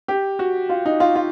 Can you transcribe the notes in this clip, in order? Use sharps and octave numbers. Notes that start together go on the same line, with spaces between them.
G4
F#4
F4
D#4
F4
F4